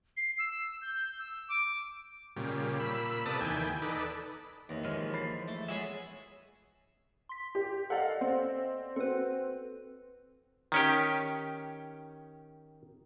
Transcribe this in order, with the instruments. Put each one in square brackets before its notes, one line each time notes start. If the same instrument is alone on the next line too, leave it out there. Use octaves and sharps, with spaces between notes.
[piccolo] C7
E6
G6
E6
D6
[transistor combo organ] A#2 C#3 G3
A#2 B5 E6
C3 A4 B4 D5 A5 D#6
D#2 E3 G5 G#5
D#4 A4 B4 D5
[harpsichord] D#2 [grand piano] B4 C#5 E5
[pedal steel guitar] E3 F3 G#3 [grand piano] C#5 F6
[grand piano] B5 A6 C7
[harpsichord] A3
[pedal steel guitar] G#3 B3 E5 [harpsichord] F#4 G#4 C#5
[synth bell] C6 B6
[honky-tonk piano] G4
[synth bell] A4 D5 D#5 [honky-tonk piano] F5 F#5
[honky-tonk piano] C4
[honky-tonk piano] C4 F#4 [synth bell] A4 B4
[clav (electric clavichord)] D#3 C#4 G4